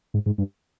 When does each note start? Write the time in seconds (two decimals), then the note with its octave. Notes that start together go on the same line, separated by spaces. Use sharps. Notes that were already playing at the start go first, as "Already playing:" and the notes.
0.14 G#2
0.26 G#2
0.38 G2